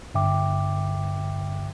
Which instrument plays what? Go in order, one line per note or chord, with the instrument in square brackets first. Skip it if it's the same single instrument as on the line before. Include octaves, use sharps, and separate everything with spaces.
[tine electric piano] G2 D3 E5 G5 D6